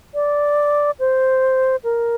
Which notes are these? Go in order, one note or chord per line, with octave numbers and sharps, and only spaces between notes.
D5
C5
A#4